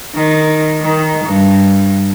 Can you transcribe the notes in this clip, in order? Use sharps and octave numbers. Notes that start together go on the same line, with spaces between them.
D#3
D#3
G2